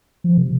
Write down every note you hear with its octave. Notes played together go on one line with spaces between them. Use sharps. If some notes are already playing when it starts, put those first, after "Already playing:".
F3
C3